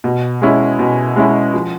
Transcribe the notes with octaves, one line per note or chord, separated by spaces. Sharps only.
B2
G#3 C#4 E4
B2
G#3 C#4 E4
F3